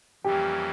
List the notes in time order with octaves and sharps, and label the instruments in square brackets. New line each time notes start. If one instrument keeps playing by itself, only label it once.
[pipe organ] F2 E3 G3 A#3 C#4 [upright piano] G4 G5